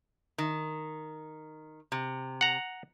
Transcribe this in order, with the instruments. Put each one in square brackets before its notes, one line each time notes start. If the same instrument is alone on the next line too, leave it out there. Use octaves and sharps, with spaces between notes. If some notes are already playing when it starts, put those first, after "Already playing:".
[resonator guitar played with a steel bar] D#3
C3
[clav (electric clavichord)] F#5 A#5